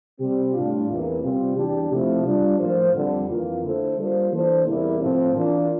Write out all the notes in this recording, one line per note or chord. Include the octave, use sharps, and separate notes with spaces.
C3 G3 C4 G4
A2 G3 D4 F4
E2 C3 E3 A#3
C3 G3 C4 F4
E2 E3 G3 D4 G4
C3 F3 A3 E4
G3 D4 F4
A2 F3 A#3 F4 C5
F2 D3 G3
F2 E3 A#3 F4
D3 A3 E4 A4 C5
G3 A#3 D4 F4 C5
E3 A#3 D4 A4 C5
E2 C3 G3 A#3 E4
A2 F3 C4
E3 A#3 D4 F4